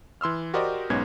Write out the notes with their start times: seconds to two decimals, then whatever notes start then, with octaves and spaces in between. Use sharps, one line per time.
0.21 E3 C6 E6 F6
0.54 F#4 G4 A#4 C5 D5 D#5
0.90 B1 G#2 G#3 B3 C#4 G#6